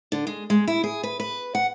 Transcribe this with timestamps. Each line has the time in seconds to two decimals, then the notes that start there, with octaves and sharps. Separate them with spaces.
0.12 D3
0.27 G#3
0.50 G#3
0.68 E4
0.84 G#4
1.03 B4
1.20 B4
1.55 F#5